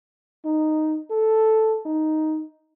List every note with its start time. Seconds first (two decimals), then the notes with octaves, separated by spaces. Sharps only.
0.45 D#4
1.10 A4
1.85 D#4